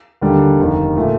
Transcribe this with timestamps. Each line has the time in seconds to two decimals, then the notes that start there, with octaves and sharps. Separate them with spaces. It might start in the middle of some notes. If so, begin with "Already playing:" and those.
0.21 D#2 D3 G3 D4
0.58 F1 D#2 D#3
0.96 A#2 A3